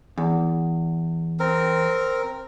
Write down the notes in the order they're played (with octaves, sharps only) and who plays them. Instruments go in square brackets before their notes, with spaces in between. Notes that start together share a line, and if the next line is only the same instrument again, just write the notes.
[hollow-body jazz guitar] E2
[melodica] C4 A#4